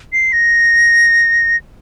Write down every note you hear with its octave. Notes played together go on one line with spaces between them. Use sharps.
C7
A#6